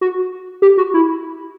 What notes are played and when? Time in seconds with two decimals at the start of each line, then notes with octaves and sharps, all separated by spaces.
0.01 F#4
0.62 G4
0.77 F#4
0.94 E4